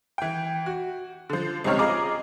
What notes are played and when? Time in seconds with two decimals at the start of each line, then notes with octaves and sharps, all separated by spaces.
0.18 E3 G5
0.66 F#4
1.29 D3 F3
1.64 C#2 C3 C4 D#4 C#5 F6
1.79 F4 G#4 D#5 A#5 D6